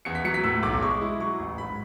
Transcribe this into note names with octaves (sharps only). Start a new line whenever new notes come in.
E2 C#7
B6
F#3 C#7
B6
A2 E6
B1 D6
G#3 C#6
E4
F#3 C#6
A1
G#2 B5